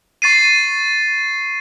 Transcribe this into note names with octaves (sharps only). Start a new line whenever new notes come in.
C#6 A6 C7 D#7